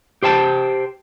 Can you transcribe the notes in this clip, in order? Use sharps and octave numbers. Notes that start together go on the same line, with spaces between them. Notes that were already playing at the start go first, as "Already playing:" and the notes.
G4 C5 G5 A5